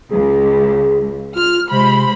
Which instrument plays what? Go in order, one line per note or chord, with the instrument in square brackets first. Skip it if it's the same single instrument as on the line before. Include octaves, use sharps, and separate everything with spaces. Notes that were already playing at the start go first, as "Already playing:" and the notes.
[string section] C#2 [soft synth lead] G#4
[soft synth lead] F4 [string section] F6
[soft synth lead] C3 [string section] G#3 C5 B5